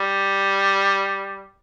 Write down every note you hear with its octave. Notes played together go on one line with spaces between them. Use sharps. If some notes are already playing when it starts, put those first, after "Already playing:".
Already playing: G3